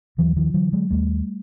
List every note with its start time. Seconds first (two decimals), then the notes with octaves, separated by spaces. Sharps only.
0.18 D#2 E3 F#3
0.36 D#3 F3
0.54 D3 E3 F#3
0.73 F#3 G#3
0.91 D#2 G3 A3